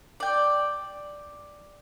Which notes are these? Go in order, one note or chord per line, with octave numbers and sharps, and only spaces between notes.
D5 G5